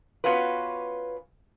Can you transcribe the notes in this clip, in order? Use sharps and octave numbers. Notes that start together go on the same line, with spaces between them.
B3 C#4 F4 F#4 B4